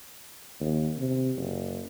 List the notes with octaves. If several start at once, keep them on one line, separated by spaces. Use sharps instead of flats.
D#2
C3
F#1